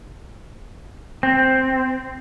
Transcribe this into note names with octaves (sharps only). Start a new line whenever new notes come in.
C4